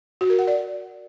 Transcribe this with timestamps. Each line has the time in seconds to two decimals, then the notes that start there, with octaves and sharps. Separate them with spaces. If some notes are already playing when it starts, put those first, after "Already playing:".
0.21 F#4
0.30 A#4
0.39 F#5
0.47 D5